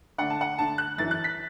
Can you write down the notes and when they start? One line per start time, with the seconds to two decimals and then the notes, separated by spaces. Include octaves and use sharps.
0.18 D3 A3 D4 F#5
0.30 A5
0.41 F#5
0.58 D3 A3 D4 A5
0.78 F#6
0.98 F#2 E3 D4 A6
1.11 F#6
1.24 B6